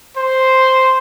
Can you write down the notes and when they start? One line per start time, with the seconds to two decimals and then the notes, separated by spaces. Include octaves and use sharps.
0.17 C5